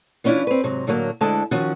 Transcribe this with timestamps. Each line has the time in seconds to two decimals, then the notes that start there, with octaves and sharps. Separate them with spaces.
0.24 E3 B3 C#4 D4 E4 F4
0.47 C4 B4
0.64 G#2 C3 F#3
0.87 A2 D3 F#3 A#3
1.21 D2 D3 G#3 E4 A5
1.51 D#3 F3 C#4 F#4